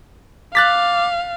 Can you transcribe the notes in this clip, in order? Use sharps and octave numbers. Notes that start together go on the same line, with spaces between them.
F5 D6 F#6 A6 B6